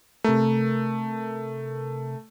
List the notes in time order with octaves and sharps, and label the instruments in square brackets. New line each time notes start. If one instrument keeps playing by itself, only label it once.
[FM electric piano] C3 A#4 [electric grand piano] A3